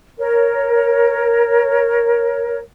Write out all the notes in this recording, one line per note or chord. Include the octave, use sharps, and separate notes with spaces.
A#4 C#5